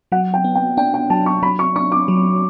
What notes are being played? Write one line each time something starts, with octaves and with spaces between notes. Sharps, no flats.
F#3 F#5
G5
B3
G5
D4 G5
G5
F#3 A5
C#6
F#3 B5
C#6
D4 C#6
D6
F#3